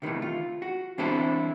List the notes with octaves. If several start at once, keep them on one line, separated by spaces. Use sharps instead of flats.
C3 D#3 E3 A3
F4
F#4
E3 C4 D4 E4 A4 C5